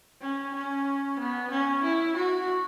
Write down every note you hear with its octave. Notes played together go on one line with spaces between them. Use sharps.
C#4
C#4
B3
C#4
E4
F#4